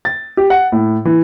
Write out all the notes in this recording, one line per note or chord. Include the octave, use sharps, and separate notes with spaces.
A6
G4
F#5
A2
E3